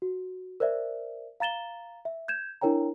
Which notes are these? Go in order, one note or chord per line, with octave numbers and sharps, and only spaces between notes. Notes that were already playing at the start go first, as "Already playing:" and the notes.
F#4
A#4 C5 D5 E5
F5 A#5 A6 E7 G7
E5
G6 G#6 E7
D4 E4 A#4 C#5 G5 A#5